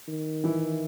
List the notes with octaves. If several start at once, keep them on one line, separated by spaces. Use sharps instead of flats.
D#3
E3 E4